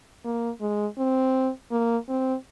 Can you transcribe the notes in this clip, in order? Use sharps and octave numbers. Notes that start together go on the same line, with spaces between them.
A#3
G#3
C4
A#3
C4